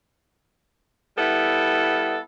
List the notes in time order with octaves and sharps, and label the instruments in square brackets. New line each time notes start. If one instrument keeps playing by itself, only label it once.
[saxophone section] G3 B3 E4 A4